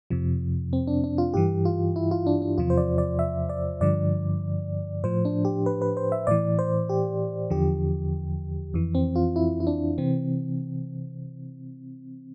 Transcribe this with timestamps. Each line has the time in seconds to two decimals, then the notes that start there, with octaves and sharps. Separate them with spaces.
0.10 F2 C3 F3
0.73 C4
0.87 D4
1.04 D4
1.18 F4
1.34 G2 E3 G4
1.65 F4
1.96 E4
2.11 F4
2.26 D4
2.42 D4
2.58 E2 C3 F3 F4
2.70 C5
2.77 D5
2.98 D5
3.19 E5
3.49 D5
3.81 G2 D3 F3 D5
5.04 A2 F3 C5
5.25 D4
5.45 G4
5.66 B4
5.82 B4
5.97 C5
6.12 E5
6.27 A2 E3 D5
6.59 C5
6.89 G4
7.50 E2 D3 F3 G4
8.74 F2 E3
8.95 C4
9.16 F4
9.36 E4
9.60 E4
9.67 D4
9.98 C3 E3 C4